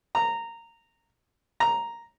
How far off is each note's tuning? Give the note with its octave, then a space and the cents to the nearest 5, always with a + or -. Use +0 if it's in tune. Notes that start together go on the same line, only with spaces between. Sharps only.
A#5 -15
A#5 +0